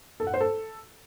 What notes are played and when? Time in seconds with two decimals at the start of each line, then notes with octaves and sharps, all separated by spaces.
0.20 A4
0.27 F#5
0.34 C5
0.41 A4